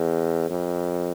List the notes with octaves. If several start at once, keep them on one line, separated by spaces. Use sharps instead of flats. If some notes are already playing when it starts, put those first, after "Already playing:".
Already playing: E2
F2